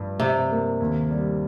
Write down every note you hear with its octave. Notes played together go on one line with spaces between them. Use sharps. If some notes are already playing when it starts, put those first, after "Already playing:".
Already playing: G2 F3
G2 C3
A#3
D#2
G3